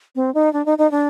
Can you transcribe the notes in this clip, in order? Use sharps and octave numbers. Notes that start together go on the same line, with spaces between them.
C4
D#4
D4
D#4
D#4
D4